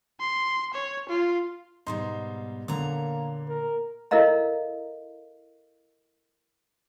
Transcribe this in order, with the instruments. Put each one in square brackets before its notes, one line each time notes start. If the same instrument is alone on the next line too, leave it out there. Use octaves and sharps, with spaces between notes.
[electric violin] C6
C#5
F4
[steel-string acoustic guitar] G#2 B2 G3 [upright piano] D#4 C6
[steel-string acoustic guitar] A#2 C#5 A#5 [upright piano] D3 [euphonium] A#3
[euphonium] A#4
[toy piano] E4 A4 A#4 D#5 F5 A#5